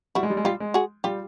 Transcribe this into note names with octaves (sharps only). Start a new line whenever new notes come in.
G3 E4 F#4
G#3
G3
G#3
G3 F4 G4
G#3
F#4 G#4
G3 F4 G4